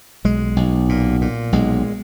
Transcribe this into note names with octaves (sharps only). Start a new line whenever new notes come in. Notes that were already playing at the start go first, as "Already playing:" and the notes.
B1 G#3
B1
A#2
A#2
B1 G#3